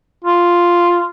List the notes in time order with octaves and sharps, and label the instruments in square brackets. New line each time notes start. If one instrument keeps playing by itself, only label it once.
[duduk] F4